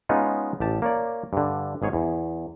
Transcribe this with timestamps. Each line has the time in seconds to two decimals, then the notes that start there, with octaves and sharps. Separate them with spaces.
0.09 G#3 B3 C#4 D#4 F4
0.60 A1 G4 A5
0.82 A#3 C#5 D5
1.33 G2 D3
1.82 G#1 G#2 G#4 C#5
1.93 E2